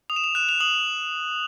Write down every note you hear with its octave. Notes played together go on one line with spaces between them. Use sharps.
D#6 F7
E7
F7
F#6 E7
F7
D#6 F#7